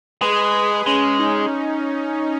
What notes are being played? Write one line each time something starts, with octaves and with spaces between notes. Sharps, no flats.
G#3 G#4 B4
G#3 C#4
D#4